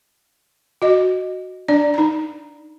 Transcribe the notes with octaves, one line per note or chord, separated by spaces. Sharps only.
F#4 D#5
D4 D5
D#4 A#5